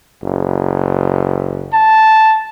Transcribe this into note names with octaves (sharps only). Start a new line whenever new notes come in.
F#1
A5